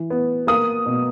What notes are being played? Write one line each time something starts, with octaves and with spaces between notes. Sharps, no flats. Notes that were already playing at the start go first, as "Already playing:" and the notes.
Already playing: E3
B3
A#3 D#6
B2